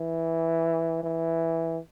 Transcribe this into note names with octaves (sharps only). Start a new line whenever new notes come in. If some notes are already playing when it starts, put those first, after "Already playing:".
Already playing: E3
E3